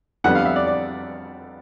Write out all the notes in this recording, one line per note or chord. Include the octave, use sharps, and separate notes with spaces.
F2 D3 G3 B3 F#5
F5
E5
D5
D5